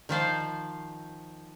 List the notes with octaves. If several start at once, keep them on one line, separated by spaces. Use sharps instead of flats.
D#3 F3 C5 F5